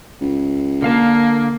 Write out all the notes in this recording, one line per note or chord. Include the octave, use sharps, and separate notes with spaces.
C#2
D3 A#3 F5 A5